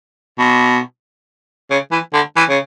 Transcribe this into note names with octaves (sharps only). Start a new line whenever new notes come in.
B2
C#3
E3
D3
E3
C#3